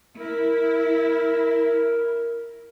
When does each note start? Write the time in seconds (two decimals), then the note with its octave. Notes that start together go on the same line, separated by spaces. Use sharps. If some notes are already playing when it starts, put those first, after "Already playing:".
0.19 E4 A#4